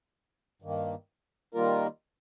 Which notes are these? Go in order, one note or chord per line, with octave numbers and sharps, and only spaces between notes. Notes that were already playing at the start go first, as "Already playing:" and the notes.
G2 D#3 A#3
D#3 G3 A#3 F4 A#4